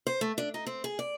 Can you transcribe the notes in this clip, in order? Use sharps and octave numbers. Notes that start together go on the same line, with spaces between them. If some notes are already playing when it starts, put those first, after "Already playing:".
C5
A3
D4
D#4
C4
G#4
D5